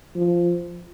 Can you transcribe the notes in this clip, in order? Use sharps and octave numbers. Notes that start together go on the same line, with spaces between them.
F3